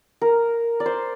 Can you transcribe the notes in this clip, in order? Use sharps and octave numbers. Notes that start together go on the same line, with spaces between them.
A#4
D5
C5